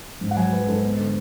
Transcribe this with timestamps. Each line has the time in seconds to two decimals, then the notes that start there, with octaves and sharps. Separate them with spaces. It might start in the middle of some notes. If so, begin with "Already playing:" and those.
0.21 G#2
0.31 F#5
0.36 F#3 G#5
0.52 F#3 B4
0.67 G#2 A4
0.83 B3
0.98 D3